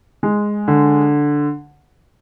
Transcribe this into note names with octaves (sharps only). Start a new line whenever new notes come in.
G#3
D3